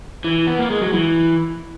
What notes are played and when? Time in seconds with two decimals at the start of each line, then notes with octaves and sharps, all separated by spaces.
0.24 E3
0.47 B3
0.59 A#3
0.70 G#3
0.81 F#3
0.93 E3